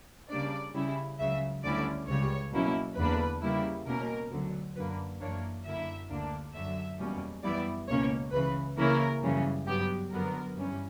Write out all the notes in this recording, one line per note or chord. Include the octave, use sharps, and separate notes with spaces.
C#3 G3 A#3 D4 D5
C#3 G3 C#4 E4
C#2 C#3 F#3 E5
D2 D3 G3 C#4 E4 D5
C#2 C#3 G3 C#5
B2 F#3 A#3 C#4 E4
E2 D3 A#3 D4 B4
C#3 G3 A#3 E4
B2 A#3 C#4 A#4
D2 D3 F#3
F#2 D3 A#3 B4
F#2 E3 A#3 D4 C#5
F#2 D3 A#3 E4 E5
D2 D3 A#3 D4
F#2 D3 F#3 E5
E2 B2 G3 A#3 C#4
F#2 E3 G3 B3 E4 D5
C#2 B2 A#3 C#4 C#5
C#2 C#3 E3 B4
C#3 E3 A#3 C#4 E4 A#4
F#2 C#3 E3 G3 C#4
G2 F#3 B3 G4
F#2 D3 F#3 B3 A#4
G2 E3 G3 C#4